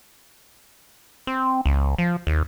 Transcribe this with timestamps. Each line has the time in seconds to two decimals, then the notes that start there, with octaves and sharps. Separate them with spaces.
1.27 C4
1.66 C#2
1.98 F3
2.27 D#2